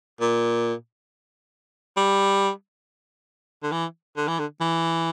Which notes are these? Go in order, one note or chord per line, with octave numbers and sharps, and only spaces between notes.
A#2
G3
D3
E3
D3
E3
D3
E3